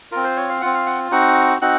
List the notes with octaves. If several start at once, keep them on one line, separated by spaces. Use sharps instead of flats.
C4 F4 A#4
C5
C#5
F5
C4 F4 F#5
F5
F#5
C4 D#4 F#4 F#5
C4 D#4 F#4 F#5